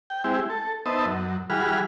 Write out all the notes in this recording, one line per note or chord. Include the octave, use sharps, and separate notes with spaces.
G5
G#3 C4 E4 G4
A4
B3 D#4 C5 D#5 E5 A5
F#2
E3 G3 F#4 G#4 B5 F6